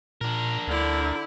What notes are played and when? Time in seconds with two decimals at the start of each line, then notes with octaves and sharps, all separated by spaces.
0.21 A#2 D4 A#4
0.67 D2 D3 E4